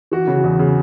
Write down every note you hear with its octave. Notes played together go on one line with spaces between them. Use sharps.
E3 F#4
C#3
E2
C#3